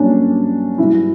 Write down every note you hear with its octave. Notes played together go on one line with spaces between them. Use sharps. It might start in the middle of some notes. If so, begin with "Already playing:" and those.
Already playing: G2 F#3 A#3 C#4 D4
G2 F#3 E4